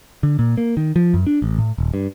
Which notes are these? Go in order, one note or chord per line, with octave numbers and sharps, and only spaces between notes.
D3
A#2
A#3
D#3
F3
F#2
D4
A1
A2
D#1
G2